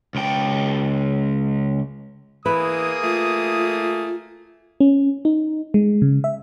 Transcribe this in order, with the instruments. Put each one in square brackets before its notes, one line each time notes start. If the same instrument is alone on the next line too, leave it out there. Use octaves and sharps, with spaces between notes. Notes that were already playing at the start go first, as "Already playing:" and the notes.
[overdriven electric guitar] C#2 G5
[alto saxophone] E3 [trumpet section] A#3 G#4 D#6 [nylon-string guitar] B4
[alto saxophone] A3 [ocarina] F4
[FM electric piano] C#4
D#4
G#3
C#3
E5